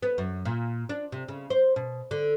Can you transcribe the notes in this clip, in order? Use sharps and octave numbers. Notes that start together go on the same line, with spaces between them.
B3
F#2
A#2
D4
C3
C#3
C5
B2
D3